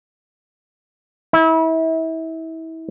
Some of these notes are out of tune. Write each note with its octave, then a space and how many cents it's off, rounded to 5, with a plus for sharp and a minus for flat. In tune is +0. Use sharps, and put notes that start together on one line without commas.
E4 -30